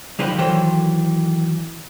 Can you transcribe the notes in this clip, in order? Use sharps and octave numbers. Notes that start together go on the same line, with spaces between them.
D3 F3 D#4 G4 B4
D#3 E3 F#3 G4 A4 C5